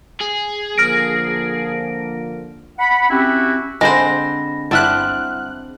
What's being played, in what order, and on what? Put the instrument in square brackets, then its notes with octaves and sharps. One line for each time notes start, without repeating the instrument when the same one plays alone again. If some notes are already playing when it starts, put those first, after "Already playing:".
[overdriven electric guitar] G#4
[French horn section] D3 F3 A#3 [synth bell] F6 A#6 D7
[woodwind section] F#5 B5
C4 C#4 E4 F#4 G4
[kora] D3 C4 [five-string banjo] G#3 C5 [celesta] B5 A#6
[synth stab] G1 E4 F#6 [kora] C4 D4 [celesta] F#5 F6